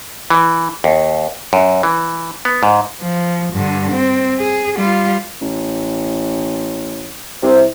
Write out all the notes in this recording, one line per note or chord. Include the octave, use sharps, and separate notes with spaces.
E3
D#2
F#2
E3
B3
G#2
F3
G2 D3
C4
G#4
G3 F4
A1
C2 C3